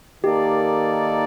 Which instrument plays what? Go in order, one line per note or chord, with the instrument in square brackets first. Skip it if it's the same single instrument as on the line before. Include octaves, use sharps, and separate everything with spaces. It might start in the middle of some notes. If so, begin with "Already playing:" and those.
[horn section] D#3 A#3 D#4 A4 D5 [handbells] G4